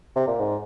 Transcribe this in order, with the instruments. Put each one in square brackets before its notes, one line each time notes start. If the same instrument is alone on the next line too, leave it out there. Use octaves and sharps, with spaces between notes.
[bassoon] C3
A#2
G#2